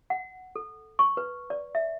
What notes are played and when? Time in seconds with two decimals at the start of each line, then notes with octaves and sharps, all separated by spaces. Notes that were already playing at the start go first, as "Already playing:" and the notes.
0.10 F#5
0.56 A4
0.99 C#6
1.17 B4
1.50 D5
1.75 E5